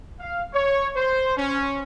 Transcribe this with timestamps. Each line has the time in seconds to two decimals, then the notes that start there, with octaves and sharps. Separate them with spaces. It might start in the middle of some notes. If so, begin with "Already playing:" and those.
0.20 F5
0.53 C#5
0.96 C5
1.37 C#4